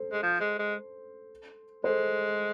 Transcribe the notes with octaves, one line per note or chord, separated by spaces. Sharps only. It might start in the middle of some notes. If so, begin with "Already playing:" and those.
Already playing: A4 C5
G#3
F3
G#3
G#3
G#3 A4 C5